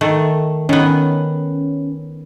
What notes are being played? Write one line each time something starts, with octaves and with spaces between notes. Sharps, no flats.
D#3 A3
D#3 B3 C#4